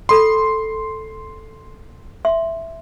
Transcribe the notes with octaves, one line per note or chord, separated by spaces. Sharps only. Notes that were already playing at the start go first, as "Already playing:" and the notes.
A4 B5 C6
E5 C6